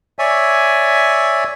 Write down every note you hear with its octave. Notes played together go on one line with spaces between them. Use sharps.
C#5 D5 E5 G#5